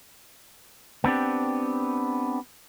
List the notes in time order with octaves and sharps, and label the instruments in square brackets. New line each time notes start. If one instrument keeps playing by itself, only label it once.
[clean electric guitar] B3 C4 D4 G4